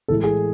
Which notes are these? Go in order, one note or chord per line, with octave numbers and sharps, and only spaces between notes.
A2 E3 G#3 A4
G#4